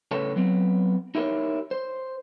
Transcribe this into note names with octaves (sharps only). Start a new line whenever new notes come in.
A2 C#3 A4 B4 C#5 A5
F#3 B3 C4
D#4 E4 G4 A#4 C#5
C5